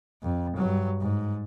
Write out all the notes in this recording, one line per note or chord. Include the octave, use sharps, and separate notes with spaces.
F2
G2 F#3
G#2